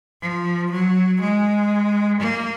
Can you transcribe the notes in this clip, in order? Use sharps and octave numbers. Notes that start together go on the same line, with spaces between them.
F3
F#3
G#3
A#3